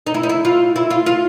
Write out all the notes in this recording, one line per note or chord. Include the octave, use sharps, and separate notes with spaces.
D#4
E4
D#4
E4
F4
E4
F4
F4